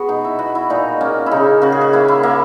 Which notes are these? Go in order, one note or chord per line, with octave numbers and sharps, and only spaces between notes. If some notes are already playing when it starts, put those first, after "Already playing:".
Already playing: B3 F#4 G#4
B2 D#4
E4
B2 F#4
E4
A#2 D#4
A#3 C#4
E4
C#3 D#4
C#3 F#4
G#4
F#4
A#3 E4
E4
A#3 E4